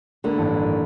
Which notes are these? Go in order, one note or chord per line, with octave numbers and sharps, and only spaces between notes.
D3 A#3 B5
A1 G2